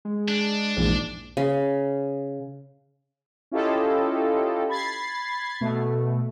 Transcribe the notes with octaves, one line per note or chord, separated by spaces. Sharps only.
G#3
D4
A#1 E2 G#2
C#3
C#4 E4 F4 G4 A4 D#5
B5 G#6 A6 C7
B2 A3